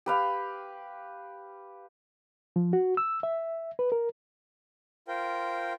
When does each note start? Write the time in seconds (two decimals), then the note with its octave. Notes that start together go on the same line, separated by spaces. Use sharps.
0.06 G4 B4 F5
2.56 F3
2.73 F#4
2.97 E6
3.23 E5
3.79 B4
3.92 A#4
5.08 F4 A#4 C5 G5